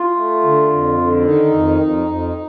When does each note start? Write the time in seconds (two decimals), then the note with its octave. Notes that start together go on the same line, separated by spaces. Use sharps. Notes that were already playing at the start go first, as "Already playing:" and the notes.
Already playing: F4
0.16 A3
0.43 D3
0.70 F2
0.98 D3
1.25 D#3 D#4
1.52 F2
1.80 F2
2.07 F2